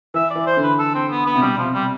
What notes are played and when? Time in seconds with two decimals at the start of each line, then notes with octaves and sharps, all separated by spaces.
0.14 E3 E5
0.31 E3 D5
0.46 C5
0.57 D3
0.63 B4
0.79 A4
0.95 C4
1.10 B3
1.26 B3
1.36 C3
1.42 B2 G3
1.58 F3
1.64 C3
1.74 G3